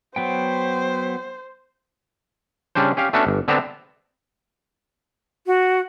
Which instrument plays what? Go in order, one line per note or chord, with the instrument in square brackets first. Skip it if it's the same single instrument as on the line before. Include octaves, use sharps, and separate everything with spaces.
[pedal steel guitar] F#3 B3 G5 [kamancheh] C5
[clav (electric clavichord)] C#3 G3 C#4 D4 C5
C#4 G4 F5
A3 B3 C#4 D4 F#4 A4
G1
D3 B3 C4 D4 A5 A#5
[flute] F#4